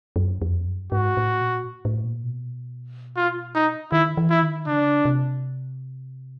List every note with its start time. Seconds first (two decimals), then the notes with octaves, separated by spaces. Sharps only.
0.16 F#2
0.42 F2
0.67 F#2
0.92 G#2 F#4
1.17 A2
1.41 A#2
1.85 A2
2.04 A#2
2.24 B2
3.16 F4
3.55 D#4
3.92 D#3 E4
4.17 E3
4.30 E4
4.43 D#3
4.67 C#3 D4
5.05 C3